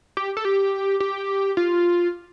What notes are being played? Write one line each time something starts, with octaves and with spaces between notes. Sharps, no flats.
G4
A4
G4
G4
F4